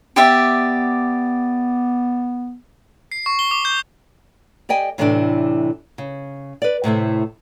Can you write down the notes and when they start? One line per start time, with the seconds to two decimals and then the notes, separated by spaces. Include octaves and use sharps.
0.16 B3 G4 D5 E5
3.12 C7
3.26 C#6
3.39 G7
3.51 D6
3.65 G6
4.69 G4 D5 D#5 G5 G#5
4.98 A2 C3 E3 A3 C#4 D4
5.98 C#3
6.62 B4 D5
6.84 A2 C3 A3 E4